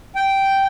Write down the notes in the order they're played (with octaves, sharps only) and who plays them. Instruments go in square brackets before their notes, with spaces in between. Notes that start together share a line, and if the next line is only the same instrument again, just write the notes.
[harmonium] G5